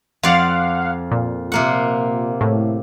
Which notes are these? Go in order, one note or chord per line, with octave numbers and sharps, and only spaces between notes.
F2 D5 F5 F#5
A#2
C3 A#3 F#5
A2